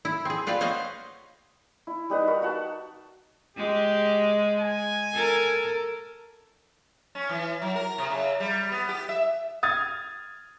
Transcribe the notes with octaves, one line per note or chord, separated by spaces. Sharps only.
E4
C4 G#4
F4 B4 D5 F5 G5
C5 C#5 D#5 F5 F#5
E4
G3 D#4 B4
F#4 A#4
F#4 F#5 A5
G#3 G4
G#5
A4 A#4
C#4
E3
F#3
A#4
C3
C#3
G3
B3
G4
E5
D#6 F6 G#6 A6